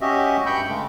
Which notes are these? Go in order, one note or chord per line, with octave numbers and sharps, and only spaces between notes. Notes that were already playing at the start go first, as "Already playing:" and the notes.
C#4 F#4 G4 D#5 E5
G2 G5 B5 C#6 G6
C#3 G#3 A3